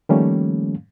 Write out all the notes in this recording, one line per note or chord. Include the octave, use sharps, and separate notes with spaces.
D#3 F3 G3 A3 A#3 C#4